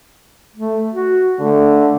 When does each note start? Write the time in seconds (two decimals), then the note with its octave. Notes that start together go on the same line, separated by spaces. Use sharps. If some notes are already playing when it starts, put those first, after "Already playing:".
0.56 A3
0.93 F#4
1.40 D3 A3